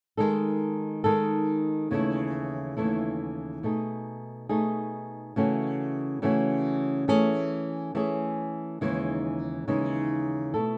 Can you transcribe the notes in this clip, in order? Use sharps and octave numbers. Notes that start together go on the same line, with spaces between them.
D#3 G#3 D#4 A4
D#3 G#3 D#4 A4
D#2 C#3 E3 A3 E4
D#2 C#3 E3 A3 E4
B2 A3 D#4 G#4
B2 A3 D#4 G#4
C#3 E3 A3 C#4 F#4
C#3 E3 A3 C#4 F#4
E3 A3 C#4 G#4
E3 A3 C#4 G#4
D#2 C#3 E3 G#3 D#4
D#2 C#3 E3 G#3 D#4
B2 A3 E4 A4